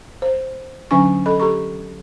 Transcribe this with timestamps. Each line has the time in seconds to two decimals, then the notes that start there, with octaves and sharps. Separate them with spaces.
0.22 C5
0.91 D3 F#3 C#4 D4 G#5 C#6
1.26 A4 D#5 B5
1.40 G4 A4 A#5 C#6